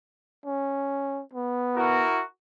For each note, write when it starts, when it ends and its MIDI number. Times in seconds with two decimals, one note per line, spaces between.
0.46 1.22 61
1.33 2.05 59
1.77 2.22 64
1.77 2.22 66
1.77 2.22 70